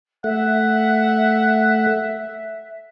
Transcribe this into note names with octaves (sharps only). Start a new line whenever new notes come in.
A3 E5 F#5